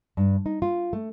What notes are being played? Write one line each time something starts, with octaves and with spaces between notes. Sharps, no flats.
G2
D#4
F4
A3